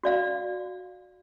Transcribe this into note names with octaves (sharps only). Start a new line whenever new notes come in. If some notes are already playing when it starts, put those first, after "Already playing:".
F#4 D5 F5